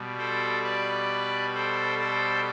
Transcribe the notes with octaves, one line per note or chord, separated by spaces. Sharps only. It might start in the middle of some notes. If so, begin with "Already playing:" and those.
Already playing: B2 G3
A4 C5
B4 D5
A4 C5
A4 C5